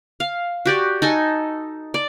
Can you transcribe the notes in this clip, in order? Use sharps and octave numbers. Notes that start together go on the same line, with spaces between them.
F5
F#4 G4 D5
D#4 A4 G#5
D5